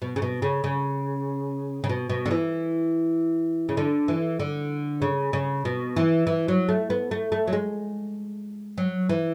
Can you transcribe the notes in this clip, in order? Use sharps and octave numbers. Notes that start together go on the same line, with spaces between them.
B2
C#3
B2
C#3
C#3
C#3
B2
B2
D3
E3
C#3
D3
E3
D3
C#3
C#3
B2
E3
E3
F#3
A3
B3
A3
A3
F#3
G#3
F#3
E3